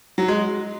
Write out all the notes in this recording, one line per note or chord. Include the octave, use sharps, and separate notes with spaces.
F#3
G#3